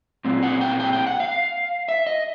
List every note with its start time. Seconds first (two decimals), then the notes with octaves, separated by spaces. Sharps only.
0.25 A#2 G3 C4
0.43 F#5
0.61 G5
0.80 G5
0.93 G5
1.07 F#5
1.20 F5
1.89 E5
2.07 D#5